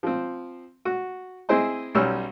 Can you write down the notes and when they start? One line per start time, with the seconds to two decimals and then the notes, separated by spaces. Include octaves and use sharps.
0.03 F3 C4
0.85 F#4
1.49 C4 E4 G#4 C5 D#5
1.95 B1 G3 C#4 C#6 E6 F6